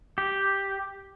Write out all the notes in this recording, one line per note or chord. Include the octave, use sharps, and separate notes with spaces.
G4